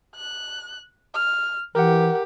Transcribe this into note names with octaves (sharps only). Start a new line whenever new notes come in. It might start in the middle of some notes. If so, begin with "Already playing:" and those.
F#6
F6
E3 G4 A#4 F#5